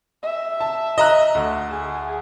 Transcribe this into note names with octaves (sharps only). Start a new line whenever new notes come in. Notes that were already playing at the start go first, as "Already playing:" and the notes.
E5
A5
D#5 A#5 F#6
D2
G#4